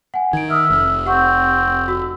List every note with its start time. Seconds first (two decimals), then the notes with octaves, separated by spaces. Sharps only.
0.14 F#5 G#5
0.33 D#3 G#6 D7
0.50 E5 D#6 F6
0.70 F1
1.06 C4 G4 F#5 C#6
1.88 F#4 E6